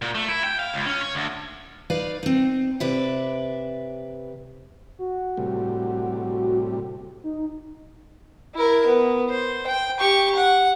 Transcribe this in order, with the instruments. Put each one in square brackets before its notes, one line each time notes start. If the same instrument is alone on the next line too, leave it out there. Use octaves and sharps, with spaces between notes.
[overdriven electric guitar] A#2
A3
E4
G5
F5
C#2
C#4
C#5
D2
[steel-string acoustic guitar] D#4 B4 D5 F5
C4 D#4
C3 B4 D5 E5
[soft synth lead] F#4
[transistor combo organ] A2 C3 G3
[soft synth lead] D#4
[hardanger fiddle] E4 A#4
B3
C5
G5
G4 C#6
F#5